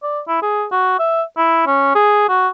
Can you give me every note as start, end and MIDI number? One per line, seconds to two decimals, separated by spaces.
0.03 0.20 74
0.28 0.38 64
0.42 0.65 68
0.72 0.96 66
0.99 1.22 76
1.37 1.63 64
1.67 1.91 61
1.95 2.24 68
2.29 2.48 66